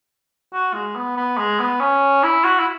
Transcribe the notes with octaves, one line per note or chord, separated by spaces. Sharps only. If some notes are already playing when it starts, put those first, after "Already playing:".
F#4
G#3
B3
B3
G#3
B3
C#4
E4
F#4
E4